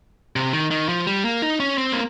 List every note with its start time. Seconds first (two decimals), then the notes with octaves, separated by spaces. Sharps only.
0.36 C3
0.53 D#3
0.71 D#3
0.89 F3
1.07 G3
1.25 A#3
1.42 D#4
1.60 C#4
1.78 C4
1.93 A#3